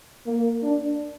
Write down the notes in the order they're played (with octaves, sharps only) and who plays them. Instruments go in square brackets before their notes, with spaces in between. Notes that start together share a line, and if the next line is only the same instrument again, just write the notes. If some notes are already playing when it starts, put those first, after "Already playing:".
[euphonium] A#3
D4